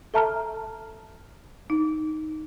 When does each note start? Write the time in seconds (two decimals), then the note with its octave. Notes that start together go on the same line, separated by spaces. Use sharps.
0.14 A4 E5 A5 A#5 F6
1.70 D#4